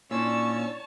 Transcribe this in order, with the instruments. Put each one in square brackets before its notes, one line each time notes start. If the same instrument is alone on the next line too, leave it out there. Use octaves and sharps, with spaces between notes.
[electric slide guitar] A#2 [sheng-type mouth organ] C#4 E6 [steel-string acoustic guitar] D4 E4 [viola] C#5 A5